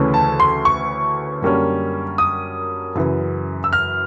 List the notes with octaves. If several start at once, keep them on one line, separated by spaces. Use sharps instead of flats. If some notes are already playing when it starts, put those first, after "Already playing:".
Already playing: D2 C#3 E3 A3 C#4
A5
C6
C#6
F#2 D3 G3 A#3 C#4
D#6
F#2 C#3 E3
E6
F6